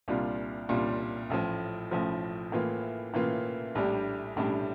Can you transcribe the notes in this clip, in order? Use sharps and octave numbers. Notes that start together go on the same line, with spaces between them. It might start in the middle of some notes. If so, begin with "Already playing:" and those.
C2 A#2 G3 D4 F4
C2 A#2 G3 D4 F4
A1 A2 F3
A1 A2 F3
A2 E3 A#3 F4
A2 E3 A#3 F4
A#1 A2 G3 D4 G4
A#1 A2 G3 D4 G4